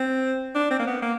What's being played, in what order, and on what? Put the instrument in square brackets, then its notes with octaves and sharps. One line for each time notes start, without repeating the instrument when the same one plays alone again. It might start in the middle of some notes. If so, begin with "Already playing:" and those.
Already playing: [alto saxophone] C4
D4
C4
A#3
B3
A#3